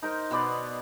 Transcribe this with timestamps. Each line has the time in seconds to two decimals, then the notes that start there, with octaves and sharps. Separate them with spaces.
0.02 D#4 A#4 C5
0.31 B2 B3 D5 C6